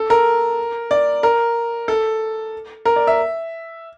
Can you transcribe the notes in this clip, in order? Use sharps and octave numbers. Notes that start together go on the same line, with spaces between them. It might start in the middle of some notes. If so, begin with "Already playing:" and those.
Already playing: A4
A#4
D5
A#4
A4
A#4
D5
E5